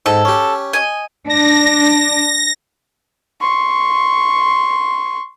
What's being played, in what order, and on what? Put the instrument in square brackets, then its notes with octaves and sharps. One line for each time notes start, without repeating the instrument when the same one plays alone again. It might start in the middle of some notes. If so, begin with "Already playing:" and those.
[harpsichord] G#2 [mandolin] A4
[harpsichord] C#4 G4
[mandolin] D#5 G#5
[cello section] D4 [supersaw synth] A#6
[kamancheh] C6 C#6